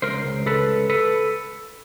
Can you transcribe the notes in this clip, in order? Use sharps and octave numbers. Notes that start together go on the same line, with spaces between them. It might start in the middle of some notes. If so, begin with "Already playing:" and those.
C#2 A#4 C5
C#2
C#2 A4 B4
C#2
A4 B4